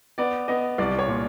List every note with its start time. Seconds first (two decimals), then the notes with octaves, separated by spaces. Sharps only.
0.18 B3 D5
0.48 B3 D#5
0.78 C2 D5
0.99 C#5
1.08 A#2